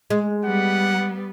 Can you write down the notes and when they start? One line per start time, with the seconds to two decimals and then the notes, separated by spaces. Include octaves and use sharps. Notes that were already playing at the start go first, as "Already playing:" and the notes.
0.10 G#3
0.45 G3 B3 F#5